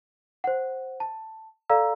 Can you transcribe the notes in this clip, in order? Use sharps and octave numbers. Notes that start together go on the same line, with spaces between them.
C5 F#5
A5
A4 D5 F5 A#5 E6